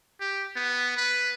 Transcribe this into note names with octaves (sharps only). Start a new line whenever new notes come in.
G4
B3
B4